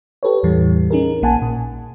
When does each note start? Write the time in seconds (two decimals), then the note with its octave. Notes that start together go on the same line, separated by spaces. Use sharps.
0.23 G4 A4 B4 C#5
0.43 E2 A2 E3 G3
0.91 C#4 D#4 G#4 A#4
1.22 A#1 A#3 F#5 G#5 A5
1.42 A#2